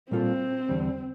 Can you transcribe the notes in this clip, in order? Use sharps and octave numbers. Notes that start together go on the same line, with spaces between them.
A#2 G3 A#3 C4 F4 A4
E2 D3 G3